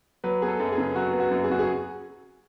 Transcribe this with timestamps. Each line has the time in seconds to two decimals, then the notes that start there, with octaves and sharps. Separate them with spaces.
0.24 F#3 B4
0.42 B3 G#4
0.48 A4
0.60 F#2
0.72 G#4
0.78 C#3
0.96 F#3 F#4
1.13 B3
1.20 F#4
1.31 F#2
1.44 G#4
1.50 C#3 F#4
1.59 G#4